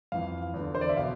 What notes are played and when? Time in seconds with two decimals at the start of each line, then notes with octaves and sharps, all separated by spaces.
0.12 F2 E3 F5
0.54 E2
0.59 D3
0.75 C5
0.81 D5
0.89 E5
0.97 B2 F5